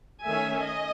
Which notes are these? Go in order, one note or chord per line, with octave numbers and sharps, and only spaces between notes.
D#3 A3 C#4 E5 G#5
D#5